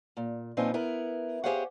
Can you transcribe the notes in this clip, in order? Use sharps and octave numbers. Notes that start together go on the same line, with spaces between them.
A#2
A#2 F3 C4 C#4 D#4 B4
B3 E4 A#4
G4 G#4 C5 C#5 F5 F#5